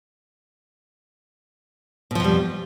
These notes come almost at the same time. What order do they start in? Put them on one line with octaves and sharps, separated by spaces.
B2 F3 F2 G3